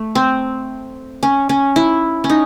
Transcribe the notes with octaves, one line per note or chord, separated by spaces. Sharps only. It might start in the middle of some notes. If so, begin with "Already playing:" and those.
Already playing: A3
C4
C#4
C#4
E4
C#4
D#4